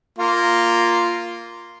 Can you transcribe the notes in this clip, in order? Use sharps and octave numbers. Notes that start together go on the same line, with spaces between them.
A#3 F4